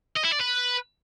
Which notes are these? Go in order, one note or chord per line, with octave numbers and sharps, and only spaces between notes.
D#5
E4
D5
B4